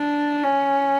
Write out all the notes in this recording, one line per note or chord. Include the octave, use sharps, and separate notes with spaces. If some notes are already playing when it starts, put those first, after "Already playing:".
Already playing: D4
C#4